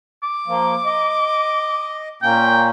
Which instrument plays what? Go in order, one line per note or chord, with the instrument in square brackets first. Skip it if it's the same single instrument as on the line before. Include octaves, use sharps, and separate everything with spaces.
[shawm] D6
[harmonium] F3 A#3
D#5
[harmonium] A#2 A#3 C#4 [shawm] G5